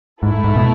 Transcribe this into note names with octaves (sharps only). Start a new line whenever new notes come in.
G#2 A3 E4 A4
G#2
B2